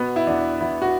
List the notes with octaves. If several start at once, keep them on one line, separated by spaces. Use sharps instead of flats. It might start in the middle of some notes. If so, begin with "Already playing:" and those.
Already playing: B2 B3
E4
E2 D4
E2 E4
F#4